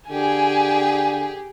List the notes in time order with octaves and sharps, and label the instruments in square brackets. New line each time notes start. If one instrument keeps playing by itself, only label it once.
[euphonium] D3 [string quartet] G4 G#4 [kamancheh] G#5